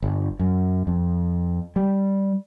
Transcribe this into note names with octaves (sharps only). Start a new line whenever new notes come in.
G1
F#2
F2
G3